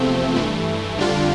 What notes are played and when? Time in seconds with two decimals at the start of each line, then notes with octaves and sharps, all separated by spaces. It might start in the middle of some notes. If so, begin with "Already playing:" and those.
Already playing: E2 C3 F3 A3 C4
0.36 G2 E3 A3
0.97 F2 D3 G3 D4 F4